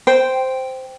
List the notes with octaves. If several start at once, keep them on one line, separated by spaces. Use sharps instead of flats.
C5 G5